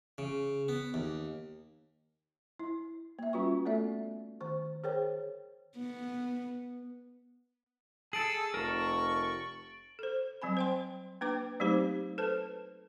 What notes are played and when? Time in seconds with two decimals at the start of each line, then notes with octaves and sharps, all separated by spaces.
0.18 C#3
0.68 B3
0.94 D#2
2.60 E4
3.19 A#3 E5
3.33 G3 C#4 F4 F#4 B4 C#6
3.65 A3 B3 A4 D5 E5
4.40 D#3 C5 C#6
4.84 G#4 A#4 C5 C#5 G5
5.78 B3
8.13 G#4 A4 A5 A6 D7 F#7
8.54 F1 A#4 A5 C#6
9.99 A4 C5
10.42 F#3 G3 C4 G#5 B5
10.57 C5 G5 C6
11.21 A#3 D4 B4 G5 D6
11.60 F#3 A3 C4 D#4 G4 C5
12.18 A4 B4 C5 A5